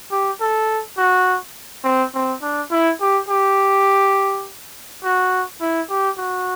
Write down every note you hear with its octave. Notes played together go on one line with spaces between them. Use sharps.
G4
A4
F#4
C4
C4
D4
E4
G4
G4
F#4
E4
G4
F#4